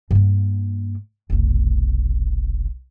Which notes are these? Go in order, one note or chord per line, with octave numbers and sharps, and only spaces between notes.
G2 A#3
F1 B1